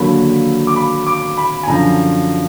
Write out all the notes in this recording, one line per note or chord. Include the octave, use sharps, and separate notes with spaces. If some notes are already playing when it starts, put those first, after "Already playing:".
Already playing: D#2 D3 F#3 A#3 B5
D6
B5
D6
B5
G#5
F#2 D3 F3 A#5